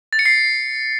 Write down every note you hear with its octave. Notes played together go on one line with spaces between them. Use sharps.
A6
C#7
C7